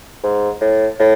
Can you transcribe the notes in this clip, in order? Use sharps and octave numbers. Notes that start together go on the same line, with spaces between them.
G#2
A2
A2